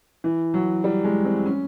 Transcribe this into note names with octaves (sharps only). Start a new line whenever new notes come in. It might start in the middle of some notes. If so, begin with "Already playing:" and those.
E3
F#3
G3
G#3
C4
C#4